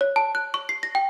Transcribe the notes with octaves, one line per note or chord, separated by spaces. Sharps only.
C#5
A5
F#6
C#6
C7
A#6
G5